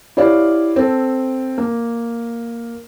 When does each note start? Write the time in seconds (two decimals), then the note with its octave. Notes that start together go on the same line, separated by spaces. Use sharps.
0.17 E4 G4 C#5 D5 F5
0.76 C4 A4
1.58 A#3